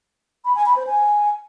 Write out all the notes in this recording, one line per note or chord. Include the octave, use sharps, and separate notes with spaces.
B5
G#5
B5
C5
G#5